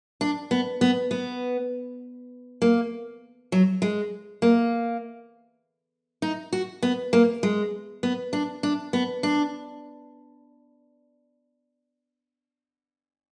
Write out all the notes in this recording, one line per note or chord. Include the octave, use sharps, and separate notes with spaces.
D4
B3
B3
B3
A#3
F#3
G#3
A#3
D#4
F#4
B3
A#3
G#3
B3
D4
D4
B3
D4